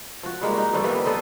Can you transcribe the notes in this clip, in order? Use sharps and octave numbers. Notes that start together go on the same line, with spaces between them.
F3 F#4
G3 G#3 A#3
D#4 F#4
G2 D3 F3 G3
E3 G3 A#3 B3
B3 A4 C5 D#5